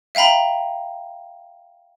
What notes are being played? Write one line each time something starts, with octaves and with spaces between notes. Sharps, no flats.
E5 F5 G5 A#5 B5